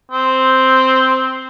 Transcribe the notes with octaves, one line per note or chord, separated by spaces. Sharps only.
C4